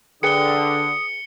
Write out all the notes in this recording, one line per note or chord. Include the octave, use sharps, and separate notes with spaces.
D3 G#4 B4 G5 D#6 C#7 G7